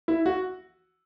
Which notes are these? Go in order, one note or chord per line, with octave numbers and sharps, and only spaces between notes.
E4
F#4